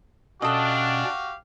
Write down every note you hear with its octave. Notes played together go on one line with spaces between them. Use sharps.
B2 C#4 D4 F#4 G4 A4 D#5 F5